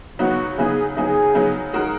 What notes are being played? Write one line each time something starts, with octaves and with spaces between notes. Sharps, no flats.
C#3 F#3 B3 D#4 F#4
C#3 F#3 B3 D#4 G#4
C#3 F#3 B3 D#4 G#4
C#3 F#3 B3 D#4
G#3 D#4 F#4 A#4